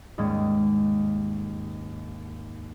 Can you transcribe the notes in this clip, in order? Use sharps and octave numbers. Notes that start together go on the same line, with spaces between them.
D#2 G#2 G#3 C#4